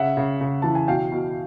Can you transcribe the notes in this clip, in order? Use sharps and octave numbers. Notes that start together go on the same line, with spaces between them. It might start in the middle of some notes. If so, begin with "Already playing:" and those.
Already playing: C#3 E5 F#5
C#3
C#3
E3 A5
G#5
B2 F5 G5
B2